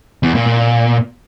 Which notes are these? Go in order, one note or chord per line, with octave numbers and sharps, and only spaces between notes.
E2
A#2
A#2